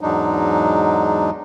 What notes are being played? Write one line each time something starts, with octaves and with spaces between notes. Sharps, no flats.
E2 G#2 F#3 G#3 D4 D#4